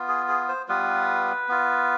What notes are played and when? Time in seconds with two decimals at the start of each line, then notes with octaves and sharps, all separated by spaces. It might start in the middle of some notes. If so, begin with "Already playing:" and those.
Already playing: B3 F4
0.08 G#4
0.28 G#4
0.48 C5
0.69 G3 B3 F4 B4
1.49 B3 F4